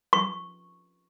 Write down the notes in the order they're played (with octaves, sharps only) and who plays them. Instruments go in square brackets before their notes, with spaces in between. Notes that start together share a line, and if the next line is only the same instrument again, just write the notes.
[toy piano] C#6